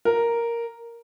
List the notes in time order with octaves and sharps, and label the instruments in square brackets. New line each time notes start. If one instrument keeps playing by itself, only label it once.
[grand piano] A#4